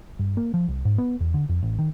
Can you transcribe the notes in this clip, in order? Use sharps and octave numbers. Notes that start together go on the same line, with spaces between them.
G2
A#3
F3
C2
G#2
B3
E2
D3
F2
A1
D#3